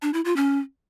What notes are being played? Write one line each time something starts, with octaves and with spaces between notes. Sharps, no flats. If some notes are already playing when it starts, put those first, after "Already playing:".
D4
E4
F4
C#4